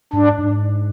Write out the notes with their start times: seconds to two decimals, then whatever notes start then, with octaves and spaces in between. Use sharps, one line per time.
0.13 G#2 D4
0.39 G#2